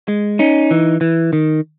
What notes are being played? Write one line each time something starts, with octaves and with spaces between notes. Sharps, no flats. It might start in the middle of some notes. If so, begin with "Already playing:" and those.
G#3
C#4 D#4
E3
E3
D#3